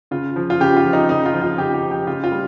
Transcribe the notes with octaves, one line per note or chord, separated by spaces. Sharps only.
C#3 F4
F3
F4
C#3 G4
F4
F3
D#4
C#3 D#4
F4
F3
F4
C#3 G4
G4
F3
G4
C#3 F4
F4
G3